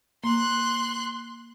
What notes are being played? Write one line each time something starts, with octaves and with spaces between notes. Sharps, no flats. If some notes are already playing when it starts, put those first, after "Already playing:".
A#3 C6 F#6